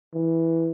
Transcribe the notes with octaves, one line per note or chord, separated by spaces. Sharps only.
E3